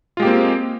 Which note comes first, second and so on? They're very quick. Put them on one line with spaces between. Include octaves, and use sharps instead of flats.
F4 G#3 G4 A#3 C4